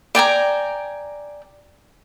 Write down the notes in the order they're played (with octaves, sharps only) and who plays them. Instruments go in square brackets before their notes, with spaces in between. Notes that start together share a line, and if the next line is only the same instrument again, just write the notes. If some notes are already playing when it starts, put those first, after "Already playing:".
[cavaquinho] D5 G5 G#5 A#5